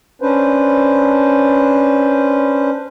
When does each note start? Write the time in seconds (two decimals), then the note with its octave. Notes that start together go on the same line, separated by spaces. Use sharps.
0.22 C#4 D4 B4 C5